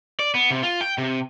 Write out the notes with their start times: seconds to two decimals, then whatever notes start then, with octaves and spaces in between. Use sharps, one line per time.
0.19 D5
0.35 B3
0.51 C3
0.63 F4
0.81 G5
0.98 C3